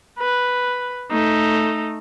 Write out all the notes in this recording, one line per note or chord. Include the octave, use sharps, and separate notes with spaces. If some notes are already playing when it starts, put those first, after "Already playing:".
B4
A3 D#4